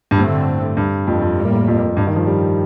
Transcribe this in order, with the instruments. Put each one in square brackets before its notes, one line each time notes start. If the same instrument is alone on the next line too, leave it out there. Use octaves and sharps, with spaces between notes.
[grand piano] G2
[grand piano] A2 [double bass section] D3 A3 C4
[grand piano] G2
F2
F2
[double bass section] A2 G3 A#3
[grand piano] F2
G2
D#3
F3
G3